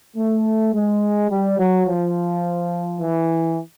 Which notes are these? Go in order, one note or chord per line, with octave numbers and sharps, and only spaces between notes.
A3
G#3
G3
F#3
F3
E3